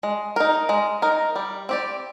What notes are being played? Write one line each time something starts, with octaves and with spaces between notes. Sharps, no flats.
G#3
D#4 A#4
G#3
D#4 A#4
G3
C4 G4 D5